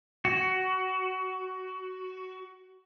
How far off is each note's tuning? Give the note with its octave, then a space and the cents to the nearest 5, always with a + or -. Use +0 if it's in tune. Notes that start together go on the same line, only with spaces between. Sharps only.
F#4 +15